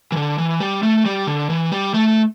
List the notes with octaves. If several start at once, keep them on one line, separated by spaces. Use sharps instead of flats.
E3
D3
E3
G3
A3
G3
D3
E3
G3
A3